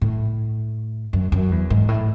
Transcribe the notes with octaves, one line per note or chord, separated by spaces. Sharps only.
A2
F#2
F#2
E2
G#2
A2